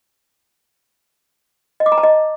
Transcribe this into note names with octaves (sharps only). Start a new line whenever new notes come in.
D#5
D6
A#5
A5
D#5